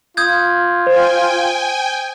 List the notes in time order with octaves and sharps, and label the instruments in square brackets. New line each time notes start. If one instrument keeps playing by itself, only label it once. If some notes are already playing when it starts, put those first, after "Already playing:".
[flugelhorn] F4 [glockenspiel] D#6 G6 G#6
[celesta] C5 [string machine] G5 G#5